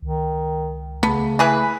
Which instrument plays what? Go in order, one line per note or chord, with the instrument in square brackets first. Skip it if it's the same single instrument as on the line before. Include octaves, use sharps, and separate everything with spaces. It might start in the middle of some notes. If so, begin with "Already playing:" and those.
[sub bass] C#2 [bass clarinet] D#3
[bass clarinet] C#3 [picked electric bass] A3 [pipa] B3
[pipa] E3 G#4 B4